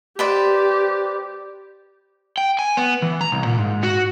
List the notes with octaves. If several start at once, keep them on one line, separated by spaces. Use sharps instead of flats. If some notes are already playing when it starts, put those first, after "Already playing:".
G4 B4 C5 D5
G5
G#5
B3
E3
A#5
C2
A#2
G#2
F#4